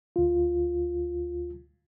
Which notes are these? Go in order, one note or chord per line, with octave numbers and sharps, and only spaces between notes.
D2 F4